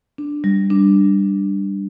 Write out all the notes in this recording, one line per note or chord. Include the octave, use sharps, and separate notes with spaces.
D4
G3
D4